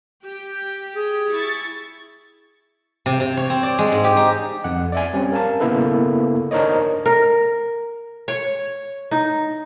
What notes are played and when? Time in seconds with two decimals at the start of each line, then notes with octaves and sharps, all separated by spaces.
0.23 G4
0.96 G#4
1.32 E4 C#6 A6
3.06 C3
3.20 C3
3.37 C#5
3.50 C4
3.63 D5
3.79 G#3
3.92 G#2
4.04 G4
4.17 D#4
4.64 F2 F#5
4.92 D5 E5 G#5
5.13 G3 C4 C#4 D5
5.32 A#4 F5 A5
5.60 C#3 A#3 B3 E4 A4 B4
6.51 D4 D#4 A#4 C5 C#5 D#5
7.06 A#4
8.28 C#5
9.11 D#4